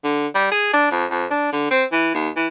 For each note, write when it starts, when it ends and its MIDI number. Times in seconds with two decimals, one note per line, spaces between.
0.04 0.27 50
0.35 0.51 55
0.52 0.73 68
0.73 0.88 62
0.91 1.05 41
1.10 1.25 41
1.31 1.52 62
1.53 1.67 50
1.71 1.84 60
1.92 2.11 52
2.14 2.29 39
2.36 2.47 52